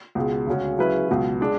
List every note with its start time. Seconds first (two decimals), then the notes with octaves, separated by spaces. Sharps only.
0.15 C#2 B2 G#3
0.47 D2 C#3 G#3 C#4 F#4
0.77 C#3 F#3 C#4 E4 B4
1.09 C#2 B2 F#3
1.40 G#3 D4